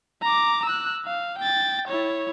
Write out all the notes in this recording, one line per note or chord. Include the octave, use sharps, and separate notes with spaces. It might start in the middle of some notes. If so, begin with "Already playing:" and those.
A#5 D6
E6 F#6
F5
G5 A6
E4 C#5